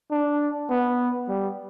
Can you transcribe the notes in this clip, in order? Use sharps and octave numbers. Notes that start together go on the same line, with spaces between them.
D4
B3
G3